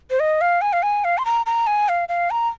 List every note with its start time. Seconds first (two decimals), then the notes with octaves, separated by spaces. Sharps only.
0.10 C5
0.20 D#5
0.41 F5
0.61 G#5
0.73 F5
0.83 G#5
1.04 F5
1.18 C6
1.25 A#5
1.46 A#5
1.67 G#5
1.89 F5
2.09 F5
2.30 A#5